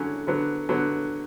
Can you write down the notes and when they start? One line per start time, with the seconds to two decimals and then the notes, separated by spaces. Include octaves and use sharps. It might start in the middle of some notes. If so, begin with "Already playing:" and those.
Already playing: D3 F#3 C#4
0.27 D3 F#3 B3
0.69 D3 F#3 B3